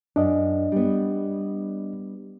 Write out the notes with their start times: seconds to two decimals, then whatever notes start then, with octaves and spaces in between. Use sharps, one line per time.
0.16 F#2 D4 D#5
0.72 G3 B3